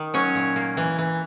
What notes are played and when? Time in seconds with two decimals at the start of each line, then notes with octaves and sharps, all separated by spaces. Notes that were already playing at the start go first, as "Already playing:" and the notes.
Already playing: D#3
0.14 F#3 C#4 C#5
0.35 A#2
0.56 A#3
0.77 E3
0.98 E3